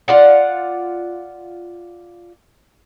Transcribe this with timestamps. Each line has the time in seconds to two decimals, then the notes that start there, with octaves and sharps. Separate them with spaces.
0.08 F4 D5 F#5